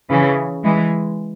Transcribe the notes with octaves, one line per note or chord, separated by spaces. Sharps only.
C#3 E3
E3 G#3